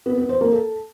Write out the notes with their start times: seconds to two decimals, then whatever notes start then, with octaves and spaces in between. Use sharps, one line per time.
0.06 B3
0.17 B3
0.29 C5
0.41 A#3
0.52 A4